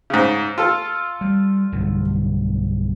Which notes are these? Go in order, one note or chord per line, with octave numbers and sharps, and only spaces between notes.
G#2 C#3
F4 A4
G3
B1 G2 D3